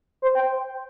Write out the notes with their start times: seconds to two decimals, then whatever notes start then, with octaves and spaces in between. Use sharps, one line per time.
0.22 C5
0.35 G5